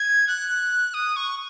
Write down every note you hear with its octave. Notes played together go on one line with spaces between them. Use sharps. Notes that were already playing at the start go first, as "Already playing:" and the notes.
Already playing: G#6
F#6
D#6
C#6